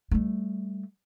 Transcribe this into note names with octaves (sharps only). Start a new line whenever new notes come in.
G3 A3